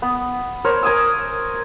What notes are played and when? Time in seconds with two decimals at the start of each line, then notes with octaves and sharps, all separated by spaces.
0.02 B3
0.64 A#4 C5 C#5
0.83 A#4 G#5 D#6 E6